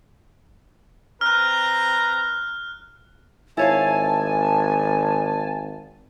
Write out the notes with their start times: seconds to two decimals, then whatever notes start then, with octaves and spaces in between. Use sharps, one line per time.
1.21 C4 B4 A#5 F6 F#6
3.57 G#1 E4 C#5 F5 G#5 A5